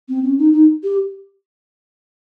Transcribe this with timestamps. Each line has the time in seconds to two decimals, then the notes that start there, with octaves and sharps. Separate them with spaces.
0.09 C4
0.23 C#4
0.39 D#4
0.53 D#4
0.83 G4